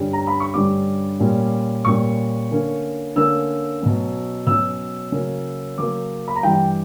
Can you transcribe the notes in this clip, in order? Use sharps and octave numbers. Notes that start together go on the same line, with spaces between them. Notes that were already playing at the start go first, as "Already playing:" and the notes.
Already playing: G2 D3 G3 C#4
A#5
B5
C#6
G2 D3 G3 C#4 D6
A#2 G3 C#4
A#2 G3 C#4 C#6
D3 A#3 C#4
D3 A#3 C#4 E6
B2 F#3 C#4
B2 F#3 C#4 E6
C#3 F#3 A#3 C#4
C#3 F#3 A#3 C#4 D6
B5
A#5
G2 E3 G3 G5